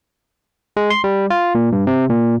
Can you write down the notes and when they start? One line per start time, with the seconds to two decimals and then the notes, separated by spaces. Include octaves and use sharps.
0.77 G#3
0.90 C6
1.04 G3
1.30 F4
1.55 A#2
1.72 G2
1.87 C3
2.10 A#2